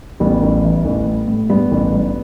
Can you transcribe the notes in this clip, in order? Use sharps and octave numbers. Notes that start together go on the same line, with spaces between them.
A1 G3 B3
A1
E3
A1
A2
A2
G2 G3 B3
A1
G2